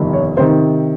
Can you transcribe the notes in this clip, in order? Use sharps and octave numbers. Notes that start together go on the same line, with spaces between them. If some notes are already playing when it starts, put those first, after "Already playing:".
Already playing: G1 F2 C3 D#3
C#5
C3 D#3 C5